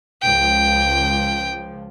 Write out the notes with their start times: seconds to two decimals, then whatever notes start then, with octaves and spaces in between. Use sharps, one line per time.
0.22 C#2 F3 G5